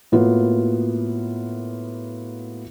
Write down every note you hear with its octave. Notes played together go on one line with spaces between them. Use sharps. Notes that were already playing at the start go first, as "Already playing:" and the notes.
A2 A#3 B3 F4 F#4